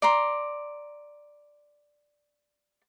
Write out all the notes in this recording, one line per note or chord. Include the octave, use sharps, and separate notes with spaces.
D5 A#5 C6